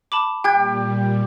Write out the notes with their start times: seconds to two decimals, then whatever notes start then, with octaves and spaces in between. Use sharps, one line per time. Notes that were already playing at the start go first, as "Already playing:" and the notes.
0.12 A5 B5 D6
0.44 A#2 G3 G4 G5 F#6 G#6